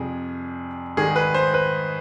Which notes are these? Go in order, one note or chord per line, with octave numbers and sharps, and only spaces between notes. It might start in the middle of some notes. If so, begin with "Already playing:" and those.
Already playing: F2 C3 G3 G#4
G#2 D#3 G3 G#4
B4
C5
B4